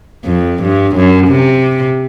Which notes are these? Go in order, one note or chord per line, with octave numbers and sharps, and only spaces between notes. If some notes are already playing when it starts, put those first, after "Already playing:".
F2
G2
F#2
C3